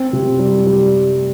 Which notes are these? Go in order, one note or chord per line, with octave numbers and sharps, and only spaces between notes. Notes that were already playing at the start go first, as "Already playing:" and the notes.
Already playing: C4
C3
G3
G3